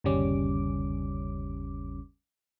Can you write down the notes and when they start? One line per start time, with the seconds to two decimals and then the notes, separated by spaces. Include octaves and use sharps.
0.04 G1 D#2 C#3 G3 C#4 D6